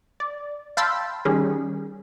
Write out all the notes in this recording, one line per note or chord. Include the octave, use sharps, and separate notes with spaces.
D5
F5 G5 A5 B5 C6 E6
D#3 G3 C#4 G#4